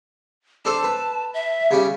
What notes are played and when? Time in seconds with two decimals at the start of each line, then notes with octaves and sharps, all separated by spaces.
0.65 D4 A4 C5 A5
0.84 B4
1.34 E5
1.71 C#3 G3 C#4